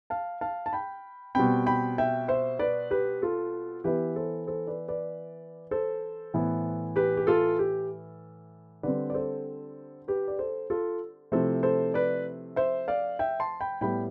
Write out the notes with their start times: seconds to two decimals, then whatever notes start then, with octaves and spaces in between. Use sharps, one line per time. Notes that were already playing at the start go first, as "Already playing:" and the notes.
0.10 F5 A5
0.41 F5 A5
0.66 A5
0.73 G5 B5
1.35 B2 G3 C4 G5 B5
1.66 G5 B5
1.98 E5 G5
2.28 C5 E5
2.59 B4 D5
2.91 G4 B4
3.22 F4 A4
3.84 E3 B3 E4 G4 B4
4.16 A4 C5
4.47 A4 C5
4.67 B4 D5
4.88 B4 D5
5.71 A4 C5
6.34 A2 E3 B3 E4
6.96 G4 B4
7.17 G4
7.27 F4 A4
7.59 G4
8.83 D3 G3 C4 B4 D5
9.10 D5
9.14 A4 C5
10.08 G4 B4
10.28 D5
10.39 A4 C5
10.70 F4 A4
11.32 C3 F3 A3 E4 A4 C5
11.63 A4 C5
11.94 B4 D5
12.56 C5 E5
12.88 D5 F5
13.19 E5 G5
13.40 A5 C6
13.60 G5 B5
13.81 A2 G3 B3 E4 G5 B5